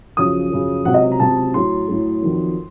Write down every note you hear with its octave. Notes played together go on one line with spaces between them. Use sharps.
F#2 C#3 F3 D#6
F#2 C#3 F3
C#2 C3 F#3 F#5
D#5
A#5
C#2 C3 F#3 A5
A2 F#3 C6
A2 F#3
F2 D#3 F#3